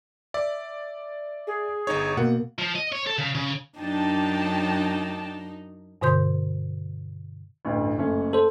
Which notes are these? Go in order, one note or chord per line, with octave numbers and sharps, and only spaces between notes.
D5 E5
G#4
G1 D#4 C#5
B2 A#3 F#5
F3
D#5
C#5
A4
C#3
C#3
F#2 D4 D#4 G5 A5
G2 B2 D3 C5 C6 G6
A1 D2 G2
F#1 A3 C#4
A4 C5